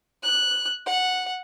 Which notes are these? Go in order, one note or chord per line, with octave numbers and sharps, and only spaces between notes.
F#6
F#5